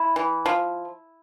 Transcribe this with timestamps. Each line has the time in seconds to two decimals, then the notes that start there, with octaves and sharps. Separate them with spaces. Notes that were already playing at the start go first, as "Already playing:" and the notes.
Already playing: E4
0.16 E3
0.46 F3